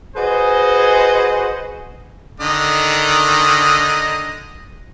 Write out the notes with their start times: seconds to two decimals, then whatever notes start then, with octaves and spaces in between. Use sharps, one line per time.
0.17 F#4 G#4 B4 C5 D#5
2.40 D3 D#3 D#5